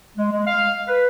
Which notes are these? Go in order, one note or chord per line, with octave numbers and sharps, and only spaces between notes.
G#3
G#3
F5
B4